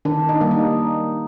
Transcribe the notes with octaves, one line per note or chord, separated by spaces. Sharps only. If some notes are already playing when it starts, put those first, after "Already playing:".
D#3 D4
D#4
G3 A#3
D#4